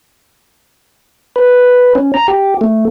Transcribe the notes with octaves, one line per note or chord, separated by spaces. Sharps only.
B4
C#4
A#5
G4
A3